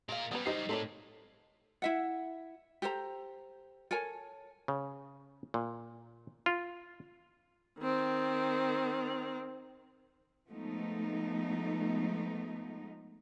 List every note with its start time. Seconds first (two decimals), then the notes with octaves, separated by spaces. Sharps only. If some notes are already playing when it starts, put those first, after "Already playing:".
0.09 A#2 G#3 A#4 F5
0.31 F#3 G3 B3 C#4 B4
0.46 D#4 G4 C5 C7
0.69 A2 C4 A4 A#4 C#5 D5
1.82 E4 E5 F#5
2.82 G4 A4 C5 A#5
3.91 A4 A#4 C#5 G#5
4.68 C#3
5.54 A#2
6.46 F4
7.79 D#3 C4
10.49 F3 G#3 A3 B3 D#4